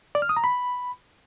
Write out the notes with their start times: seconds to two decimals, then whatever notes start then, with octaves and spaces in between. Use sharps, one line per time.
0.15 D5
0.22 F6
0.29 D#6
0.37 A#5
0.44 B5